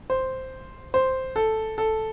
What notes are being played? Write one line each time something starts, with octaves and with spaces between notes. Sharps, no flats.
C5
C5
A4
A4